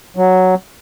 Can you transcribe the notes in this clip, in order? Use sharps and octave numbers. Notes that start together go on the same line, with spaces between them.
F#3